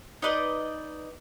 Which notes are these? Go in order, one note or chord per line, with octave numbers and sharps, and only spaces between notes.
D#4 B4 D5 D#5